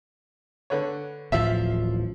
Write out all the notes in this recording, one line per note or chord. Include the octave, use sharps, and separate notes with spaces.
D3 B4 C#5
D1 A1 F3 E5 F5